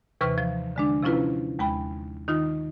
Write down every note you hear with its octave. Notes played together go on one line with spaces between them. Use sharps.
D#2 C3 E3 B4 C#6 F6
F3
D3 G#3 D4
C3 F3 C#4 E4 F4 B4
D#2 G#3 G5 B5
D#3 D#4 F4